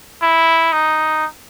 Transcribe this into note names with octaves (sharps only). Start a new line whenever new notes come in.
E4
D#4